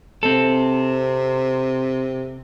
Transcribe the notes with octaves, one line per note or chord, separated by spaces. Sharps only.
C3 C4 A4